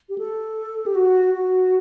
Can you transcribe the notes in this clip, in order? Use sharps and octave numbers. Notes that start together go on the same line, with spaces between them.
G4
A4
G4
F#4
F#4